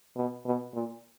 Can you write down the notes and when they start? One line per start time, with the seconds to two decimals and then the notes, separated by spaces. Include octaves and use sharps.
0.16 B2
0.45 B2
0.74 A#2